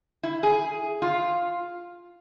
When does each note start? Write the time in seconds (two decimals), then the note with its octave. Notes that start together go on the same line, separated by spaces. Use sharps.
0.23 E4
0.43 G#4
1.02 F4